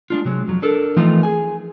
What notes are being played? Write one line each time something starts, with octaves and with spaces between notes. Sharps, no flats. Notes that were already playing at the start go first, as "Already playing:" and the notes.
G#3 D4 F4
C3 F#3 G#3
F2 F#3
D4 A4 A#4
E3 F3 A3 C4 D#4 F4
G#4 G#5